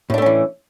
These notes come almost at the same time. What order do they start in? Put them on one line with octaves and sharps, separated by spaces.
A2 D4 A3 C#4 E3